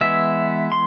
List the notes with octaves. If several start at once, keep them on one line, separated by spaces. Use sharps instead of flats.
E3 G#3 B3 E5
C6